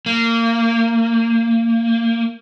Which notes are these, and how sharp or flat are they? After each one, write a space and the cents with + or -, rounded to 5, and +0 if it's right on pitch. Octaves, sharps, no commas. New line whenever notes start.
A#3 -20